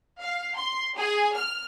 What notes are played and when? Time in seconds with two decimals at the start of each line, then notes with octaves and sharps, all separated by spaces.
0.22 F5
0.56 C6
0.97 G#4
1.35 F6